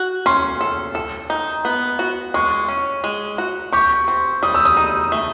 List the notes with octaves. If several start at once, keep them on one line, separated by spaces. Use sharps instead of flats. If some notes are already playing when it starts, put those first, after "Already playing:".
Already playing: F#4
C#4 C6
A4
A4
D#4
B3
F#4
G#3 C#6
C#4
G#3
F#4
G4 C#6
C4
G3 D#6
E6
D#6
D#4
A3